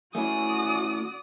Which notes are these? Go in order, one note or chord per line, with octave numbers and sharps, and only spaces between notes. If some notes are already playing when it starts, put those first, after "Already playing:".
A3 C#4 E4 F#4 D5 G#5 D#6